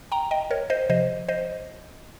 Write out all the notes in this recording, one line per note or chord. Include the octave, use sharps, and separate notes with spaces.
G5 A#5
D#5 G5
A#4 C#5
C5 D#5
C3 F3 C5 D#5
C5 D#5